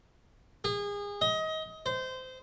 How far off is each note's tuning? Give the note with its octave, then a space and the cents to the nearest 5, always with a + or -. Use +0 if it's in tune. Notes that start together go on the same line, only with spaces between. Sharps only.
G#4 -30
D#5 +25
C5 -20